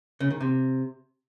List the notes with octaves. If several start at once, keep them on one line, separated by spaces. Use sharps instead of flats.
C#3
D#3
C3